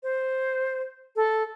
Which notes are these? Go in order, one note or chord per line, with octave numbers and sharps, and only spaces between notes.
C5
A4